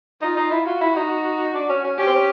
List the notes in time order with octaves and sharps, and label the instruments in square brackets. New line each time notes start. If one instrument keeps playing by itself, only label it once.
[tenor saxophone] D#4 [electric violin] F4
[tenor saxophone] D#4
E4
[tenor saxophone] F4 [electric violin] F#4
[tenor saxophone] E4
D#4
D4
C#4
C#4
[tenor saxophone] C#4 [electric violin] G4
[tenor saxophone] C4
C#4